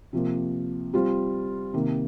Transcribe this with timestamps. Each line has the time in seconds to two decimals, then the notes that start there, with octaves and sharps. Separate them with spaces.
0.13 C3 F3 A#3
0.93 G3 C4 F4
1.74 C3 D#3 A#3